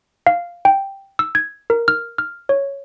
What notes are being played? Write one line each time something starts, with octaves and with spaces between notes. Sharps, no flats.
F5
G5
E6
G#6
A#4
F6
F6
C#5